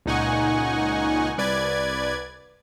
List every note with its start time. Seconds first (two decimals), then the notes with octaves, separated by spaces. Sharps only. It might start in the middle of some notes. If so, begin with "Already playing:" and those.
0.06 C#2 A#2 D#4 F#5 G#5 C#6
1.38 C2 B4 D5 G#6